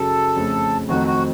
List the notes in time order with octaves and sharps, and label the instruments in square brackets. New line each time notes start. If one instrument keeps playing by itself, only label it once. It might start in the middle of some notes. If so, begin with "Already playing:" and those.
Already playing: [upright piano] F#2 C#3 F#3 [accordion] A4
[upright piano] F2 C#3 A3
[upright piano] F2 D#3 F#3 A3 C4 [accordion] F#4
[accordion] F#4